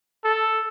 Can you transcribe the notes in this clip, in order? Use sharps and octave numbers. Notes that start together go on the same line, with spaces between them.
A4